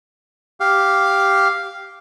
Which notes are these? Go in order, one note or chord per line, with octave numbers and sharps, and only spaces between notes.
G4 F5